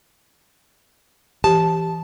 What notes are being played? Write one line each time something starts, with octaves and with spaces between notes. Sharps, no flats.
E3 G4 A5